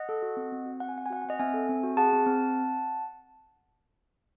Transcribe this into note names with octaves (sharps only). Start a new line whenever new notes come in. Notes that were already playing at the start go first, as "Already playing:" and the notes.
Already playing: D#5 F#5
A4
F#4
C4
C4
F#4
C4 F#5
G#5
C4 F#5
G#5
F#4 F#5
G#5
C4 D#5 F#5
C4 E5 G#5
A4
C4
F#4
G#4 F#5 A5
C4
C4